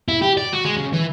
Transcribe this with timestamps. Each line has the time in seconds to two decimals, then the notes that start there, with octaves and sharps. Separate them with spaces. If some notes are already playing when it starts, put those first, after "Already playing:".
0.08 E4
0.22 G4
0.37 D5
0.53 F#4
0.65 G#3
0.77 C#3
0.93 E3